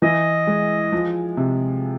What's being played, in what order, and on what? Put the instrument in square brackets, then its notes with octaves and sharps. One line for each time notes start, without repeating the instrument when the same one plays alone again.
[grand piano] E3 [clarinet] D#5
[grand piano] G#3
F3
C3